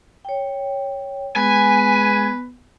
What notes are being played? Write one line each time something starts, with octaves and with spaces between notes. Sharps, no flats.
C#5 G5
G#3 B3 B4 G#5